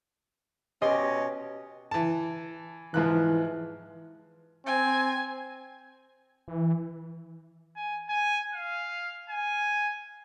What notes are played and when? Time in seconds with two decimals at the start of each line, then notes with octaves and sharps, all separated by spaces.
0.82 B2 C#4 G4 D#5 C6
1.91 E3 A5
2.94 G#2 E3 F3 F#6
4.66 C4 G#5
6.48 E3
7.76 G#5
8.09 G#5
8.54 F5
9.29 G#5